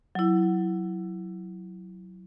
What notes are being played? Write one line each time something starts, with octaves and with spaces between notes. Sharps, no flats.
F#3 E4